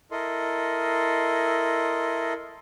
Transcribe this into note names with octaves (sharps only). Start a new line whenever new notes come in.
E4 A4 A#4 D#5 C6